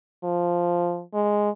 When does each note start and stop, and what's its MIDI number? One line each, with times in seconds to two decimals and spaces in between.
0.24 1.02 53
1.14 1.50 56